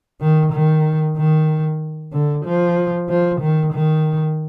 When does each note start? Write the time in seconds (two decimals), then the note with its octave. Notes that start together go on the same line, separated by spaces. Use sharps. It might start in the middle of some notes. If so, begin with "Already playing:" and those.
0.20 D#3
0.52 D#3
1.17 D#3
2.13 D3
2.45 F3
3.09 F3
3.41 D#3
3.73 D#3